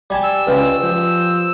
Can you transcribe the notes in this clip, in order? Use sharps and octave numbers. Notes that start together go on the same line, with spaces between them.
G3 G#5 A5
E6
C#2 B4
F3